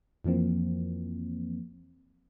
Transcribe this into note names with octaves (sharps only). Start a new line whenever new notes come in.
F2 E3 F3 A#3 C4